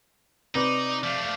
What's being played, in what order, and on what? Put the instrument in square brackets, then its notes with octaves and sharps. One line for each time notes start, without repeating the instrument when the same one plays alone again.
[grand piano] C3 C4 B4 [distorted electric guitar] D#4 [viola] D5
[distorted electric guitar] F3 A3 [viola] D5 F5